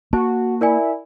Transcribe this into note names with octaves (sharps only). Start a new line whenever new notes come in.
A#3 F#4 A5
E4 A#4 D5 G#5